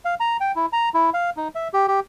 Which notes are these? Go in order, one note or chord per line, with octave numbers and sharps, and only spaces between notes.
F5
A#5
G5
E4
A#5
E4
F5
D#4
E5
G4
G4